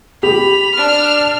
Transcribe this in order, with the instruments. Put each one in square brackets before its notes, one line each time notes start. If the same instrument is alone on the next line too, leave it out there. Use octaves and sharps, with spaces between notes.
[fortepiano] G4 [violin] B5 [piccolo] F7
[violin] D4 F6